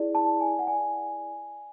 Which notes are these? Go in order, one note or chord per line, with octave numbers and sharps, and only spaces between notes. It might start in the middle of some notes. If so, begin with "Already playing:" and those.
Already playing: E4 G#4 D5
A5
G#5
F#5
E4 G#4 D5 G#5